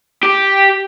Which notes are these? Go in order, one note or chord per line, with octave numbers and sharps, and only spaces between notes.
G4